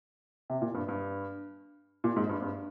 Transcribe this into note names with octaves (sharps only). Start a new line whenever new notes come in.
C3
A#2
G2
G2
A#2
G#2
G2
G2